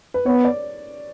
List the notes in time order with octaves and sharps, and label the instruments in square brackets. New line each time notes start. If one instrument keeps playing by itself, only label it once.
[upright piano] B4
[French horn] B3 [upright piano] C#5
[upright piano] D5